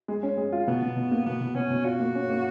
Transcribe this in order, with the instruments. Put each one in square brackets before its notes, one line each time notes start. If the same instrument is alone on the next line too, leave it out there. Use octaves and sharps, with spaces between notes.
[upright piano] G#3
C#4
G#3
F4
[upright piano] B2 [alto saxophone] B3
[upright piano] B2
B2
A#3
[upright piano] B2 [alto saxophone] B3
[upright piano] B2
[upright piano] B2 [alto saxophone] C#4
[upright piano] B2
[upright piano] F4 [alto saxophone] F#4
[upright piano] A#3
C#4
A#3